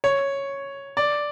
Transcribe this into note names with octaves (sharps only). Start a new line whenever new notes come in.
C#5
D5